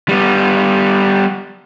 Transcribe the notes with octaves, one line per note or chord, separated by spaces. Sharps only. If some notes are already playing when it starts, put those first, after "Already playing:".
G3 B3